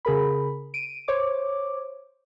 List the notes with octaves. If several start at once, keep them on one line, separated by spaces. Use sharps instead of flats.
C#3 G#4 A#4 B5
D7 D#7
C5 C#5 D6